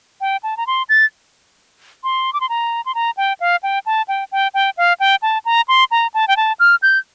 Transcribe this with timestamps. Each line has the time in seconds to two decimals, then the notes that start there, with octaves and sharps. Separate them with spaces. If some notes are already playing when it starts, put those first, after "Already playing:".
0.21 G5
0.43 A5
0.57 A#5
0.67 C6
0.89 A6
2.04 C6
2.33 D6
2.41 C6
2.49 A#5
2.86 C6
2.95 A#5
3.17 G5
3.40 F5
3.63 G5
3.86 A5
4.08 G5
4.32 G5
4.54 G5
4.77 F5
5.00 G5
5.22 A5
5.45 A#5
5.68 C6
5.91 A#5
6.14 A5
6.28 G5
6.37 A5
6.60 F6
6.82 G6